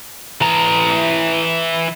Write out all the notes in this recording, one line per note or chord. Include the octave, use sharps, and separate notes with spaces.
E3 A#5